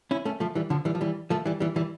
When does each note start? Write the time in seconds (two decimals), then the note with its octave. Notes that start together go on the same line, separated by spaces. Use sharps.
0.11 C#4 E4
0.25 A3 C#4
0.40 F3 A3
0.55 E3 G3
0.70 D3 F3
0.85 E3 G3
0.95 F3
1.01 E3 G3
1.30 F3 A3
1.46 E3 G3
1.60 E3 G3
1.76 E3 G3